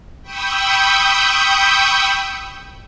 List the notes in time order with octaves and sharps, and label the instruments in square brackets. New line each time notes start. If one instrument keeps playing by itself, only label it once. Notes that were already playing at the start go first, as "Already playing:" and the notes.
[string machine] G5 B5 C#6 D#6 E6 G6